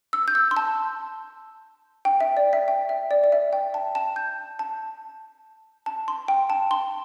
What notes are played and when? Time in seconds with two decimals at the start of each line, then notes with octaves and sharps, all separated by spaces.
0.13 E6
0.28 G6
0.35 E6
0.51 C6
0.57 A5
2.05 G5
2.20 E5
2.37 D5
2.53 E5
2.68 G5
2.89 E5
3.11 D5
3.24 D5
3.32 E5
3.53 G5
3.74 A5
3.95 A5
4.16 G6
4.59 A5
5.86 A5
6.08 C6
6.28 G5
6.50 A5
6.71 C6